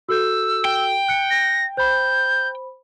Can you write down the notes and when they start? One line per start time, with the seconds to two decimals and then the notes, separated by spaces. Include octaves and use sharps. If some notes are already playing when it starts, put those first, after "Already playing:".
0.09 F#4 A4 E6 G6
0.65 G5
1.08 F#6 C#7
1.30 A#6
1.77 C5 B5 G6